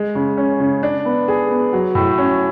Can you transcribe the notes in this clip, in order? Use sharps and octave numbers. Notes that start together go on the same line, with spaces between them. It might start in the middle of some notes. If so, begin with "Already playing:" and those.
Already playing: G#3
C#3
C#4
C#3
D4
B3
G#4
B3
F#3
A2
C#4